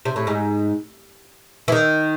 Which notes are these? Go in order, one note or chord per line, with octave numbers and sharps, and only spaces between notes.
C3
A2
G#2
E3
D#3